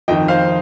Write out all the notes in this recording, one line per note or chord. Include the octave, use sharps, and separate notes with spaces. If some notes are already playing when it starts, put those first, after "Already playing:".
F2 D#3 D#5 G5
C5 F5